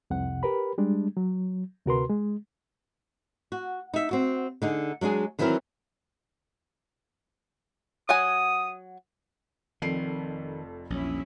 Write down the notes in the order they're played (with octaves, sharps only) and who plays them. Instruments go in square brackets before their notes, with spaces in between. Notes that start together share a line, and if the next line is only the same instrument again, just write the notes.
[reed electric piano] C2 F2 C3 F#5
G4 A#4 B4 B5
G3 G#3 D4
F#3
D2 C3 F#4 A#4 B4 C6
G#3
[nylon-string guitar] F#4
D#4 E5
C4 F#4
D3 D#4 G#4
F#3 G#3 D4 G#4
D#3 E3 F#3 C4 E4 A#4
[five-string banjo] F#3 F#5 G#5 [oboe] D#6
[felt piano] F1 F2 C7 [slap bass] D#3
[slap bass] A#1 E2 [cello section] F#3 C#4 E4